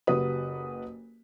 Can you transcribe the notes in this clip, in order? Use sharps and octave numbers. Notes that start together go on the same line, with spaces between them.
F#1 F#4 G4 B4 D#6